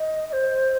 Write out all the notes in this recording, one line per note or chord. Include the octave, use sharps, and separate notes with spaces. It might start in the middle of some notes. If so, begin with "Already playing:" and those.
Already playing: D#5
D#5
C5